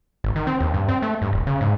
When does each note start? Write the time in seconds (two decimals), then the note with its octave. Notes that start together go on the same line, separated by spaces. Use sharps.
0.24 G#1
0.36 D#3
0.47 C4
0.60 D#2
0.74 G2
0.88 C4
1.02 A3
1.22 G2
1.33 D#1
1.47 C#3
1.61 G#2